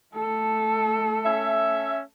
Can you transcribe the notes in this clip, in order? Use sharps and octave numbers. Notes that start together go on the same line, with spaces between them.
A3 A4
C#4 E5